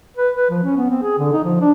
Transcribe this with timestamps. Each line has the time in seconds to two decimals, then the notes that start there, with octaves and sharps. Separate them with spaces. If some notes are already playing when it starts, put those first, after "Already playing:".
0.17 B4
0.36 B4
0.50 F3
0.64 C#4
0.77 B3
0.90 C4
1.02 G#4
1.19 D3
1.33 D#4
1.44 F3
1.61 D4